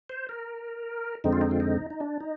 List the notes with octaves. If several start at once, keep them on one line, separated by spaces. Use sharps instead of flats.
C5
A#4
F2 D3 G#3 C4 D#4
F4
D#4
F4
D#4
D#4
D4
D#4